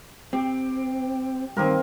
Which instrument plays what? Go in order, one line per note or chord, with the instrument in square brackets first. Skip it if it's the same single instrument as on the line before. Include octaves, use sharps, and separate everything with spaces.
[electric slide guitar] C4 [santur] G4
[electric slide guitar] G2 D#3 [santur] A#3 C4 A#4